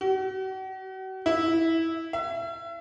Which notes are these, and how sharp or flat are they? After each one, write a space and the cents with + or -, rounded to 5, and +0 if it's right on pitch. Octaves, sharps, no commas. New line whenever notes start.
F#4 +40
E4 -10
E5 +35